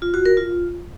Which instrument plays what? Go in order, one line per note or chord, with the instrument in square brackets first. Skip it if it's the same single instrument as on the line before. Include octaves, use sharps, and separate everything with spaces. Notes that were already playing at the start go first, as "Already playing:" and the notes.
[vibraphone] F4
F#4
A#4
F4